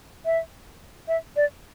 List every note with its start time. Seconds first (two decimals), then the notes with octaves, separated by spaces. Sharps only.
0.25 E5
1.08 E5
1.36 D5